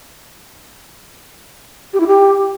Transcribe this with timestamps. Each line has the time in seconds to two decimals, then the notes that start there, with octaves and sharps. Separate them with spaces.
1.93 G4
2.00 E4
2.07 G4